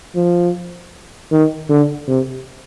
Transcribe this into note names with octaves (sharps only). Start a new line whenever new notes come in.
F3
D#3
D3
C3